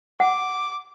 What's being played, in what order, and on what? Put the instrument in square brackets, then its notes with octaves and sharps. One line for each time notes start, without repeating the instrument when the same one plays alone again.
[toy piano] F#5 [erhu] D6